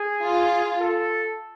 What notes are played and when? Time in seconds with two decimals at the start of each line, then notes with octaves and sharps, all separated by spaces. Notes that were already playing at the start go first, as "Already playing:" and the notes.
Already playing: G#4
0.23 F4
0.80 A4